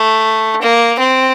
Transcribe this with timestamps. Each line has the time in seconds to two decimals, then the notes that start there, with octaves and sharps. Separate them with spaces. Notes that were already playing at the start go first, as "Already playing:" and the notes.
Already playing: A3
0.61 A#3
0.99 C4